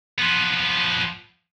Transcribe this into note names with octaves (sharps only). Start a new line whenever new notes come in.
F3 B3